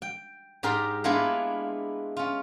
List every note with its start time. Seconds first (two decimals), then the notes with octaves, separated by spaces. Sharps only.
0.02 G5
0.63 G#2 G4 A#4 D5 A#5 C6
1.04 G#3 A#3 B3 D4 E4 F4
2.17 C#4 F4